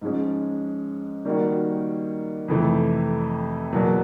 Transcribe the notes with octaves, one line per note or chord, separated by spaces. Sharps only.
G#2 F3 G#3 C#4
D#3 G3 A#3 D#4 F#4
F2 C3 E3 A3
E2 B2 F#3 A#3